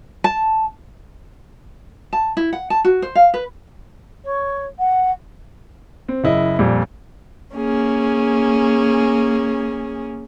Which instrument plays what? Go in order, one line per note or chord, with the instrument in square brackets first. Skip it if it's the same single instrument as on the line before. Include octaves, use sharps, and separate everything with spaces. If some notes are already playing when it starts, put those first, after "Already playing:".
[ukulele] A5
A5
E4
F#5
A5
F#4
C5
F5
B4
[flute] C#5
F#5
[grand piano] C4
F#1 E4 D#5
F2 A#2 G3
[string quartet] A#3 C#4 G#4